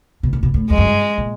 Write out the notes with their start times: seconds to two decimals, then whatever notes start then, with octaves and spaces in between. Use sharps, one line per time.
0.23 B2
0.33 A#2
0.43 B2
0.54 A2
0.70 F2 G#3
0.78 F#2
0.86 G2
1.18 A#2